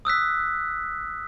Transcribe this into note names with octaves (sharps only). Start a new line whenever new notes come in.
D#6 E6 F#6 B6